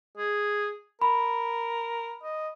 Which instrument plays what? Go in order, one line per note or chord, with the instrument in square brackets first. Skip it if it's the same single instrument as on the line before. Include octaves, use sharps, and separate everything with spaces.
[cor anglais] G#4
[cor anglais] A#4 [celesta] B5
[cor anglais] D#5